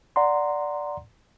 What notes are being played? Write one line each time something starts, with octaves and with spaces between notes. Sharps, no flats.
D5 F#5 A#5 C6